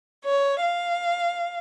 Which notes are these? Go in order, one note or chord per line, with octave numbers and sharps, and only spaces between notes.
C#5
F5